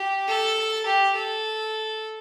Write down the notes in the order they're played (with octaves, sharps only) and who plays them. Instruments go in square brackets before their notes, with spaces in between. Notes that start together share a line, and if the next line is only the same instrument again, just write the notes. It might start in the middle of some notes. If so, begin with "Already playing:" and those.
Already playing: [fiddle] G4
A4
G4
A4